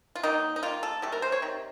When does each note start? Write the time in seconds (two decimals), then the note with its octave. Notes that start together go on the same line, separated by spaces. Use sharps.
0.15 F4
0.23 D#3 F#3 A#3 D#4
0.56 D#4
0.63 D#3 A#3 F4
0.83 A4
1.02 C3 F#3 A3 A4
1.12 A#4
1.22 C5
1.32 C#5
1.42 C3 D#3